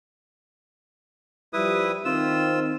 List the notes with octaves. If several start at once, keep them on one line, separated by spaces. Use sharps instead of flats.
F3 G3 E4 B4 D#6
D#3 C4 F4 E6